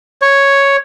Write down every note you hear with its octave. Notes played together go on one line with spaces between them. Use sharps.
C#5